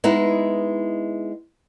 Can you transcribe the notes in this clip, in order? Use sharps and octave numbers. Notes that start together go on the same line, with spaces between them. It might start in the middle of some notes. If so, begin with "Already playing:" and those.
G#3 B3 D#4 E4